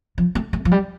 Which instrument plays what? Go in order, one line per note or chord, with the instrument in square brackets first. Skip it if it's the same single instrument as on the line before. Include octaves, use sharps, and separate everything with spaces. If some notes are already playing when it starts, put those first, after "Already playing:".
[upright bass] F3
A3
A3
F3
G3